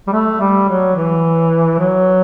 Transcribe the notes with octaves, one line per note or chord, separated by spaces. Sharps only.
G3
A3
G3
F#3
E3
F#3